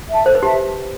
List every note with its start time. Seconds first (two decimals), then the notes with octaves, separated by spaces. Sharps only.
0.10 E5 A5
0.26 A4 C5
0.35 B4
0.43 G4 E5 A5